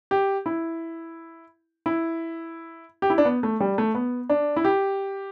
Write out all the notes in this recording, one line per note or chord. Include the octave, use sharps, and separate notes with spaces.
G4
E4
E4
G4
E4
D4
B3
A3
G3
A3
B3
D4
E4
G4